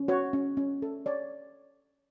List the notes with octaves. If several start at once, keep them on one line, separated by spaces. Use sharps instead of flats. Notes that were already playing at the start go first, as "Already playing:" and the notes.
Already playing: C#4
F#4 C#5
C#4
C#4
A4
C#5 D5